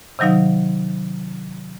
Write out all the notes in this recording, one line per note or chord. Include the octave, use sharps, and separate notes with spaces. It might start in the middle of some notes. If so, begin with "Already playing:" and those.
C3 D#3 F#3 D#4 F5